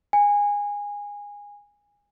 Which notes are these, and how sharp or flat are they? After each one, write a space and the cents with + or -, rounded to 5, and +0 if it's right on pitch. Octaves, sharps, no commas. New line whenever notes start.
G#5 -20